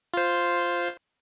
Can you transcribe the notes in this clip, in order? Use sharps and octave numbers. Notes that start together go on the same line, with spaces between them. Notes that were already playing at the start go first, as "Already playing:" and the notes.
F4 C5